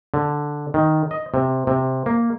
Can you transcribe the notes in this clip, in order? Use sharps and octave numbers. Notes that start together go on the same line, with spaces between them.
D3
D#3
D#5
C3
C3
A#3